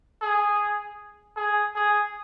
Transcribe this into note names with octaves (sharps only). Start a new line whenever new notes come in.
G#4
G#4
G#4